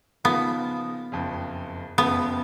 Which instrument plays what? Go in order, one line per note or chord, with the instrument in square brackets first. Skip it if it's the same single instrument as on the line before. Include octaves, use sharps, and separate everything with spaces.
[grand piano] C#3 F3 A#3 D#4 [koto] B3
[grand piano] F#1 F2 C#3
[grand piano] F#1 F2 C#3 [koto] B3